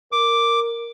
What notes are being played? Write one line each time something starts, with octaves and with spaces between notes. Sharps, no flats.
A#4 D6